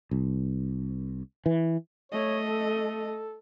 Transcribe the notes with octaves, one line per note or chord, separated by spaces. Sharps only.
C2
E3
A3 C#5 D#5
A4